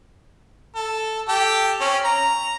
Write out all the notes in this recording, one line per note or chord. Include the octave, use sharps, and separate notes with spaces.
A4
G4 A4 G5
C4 C#4
A#5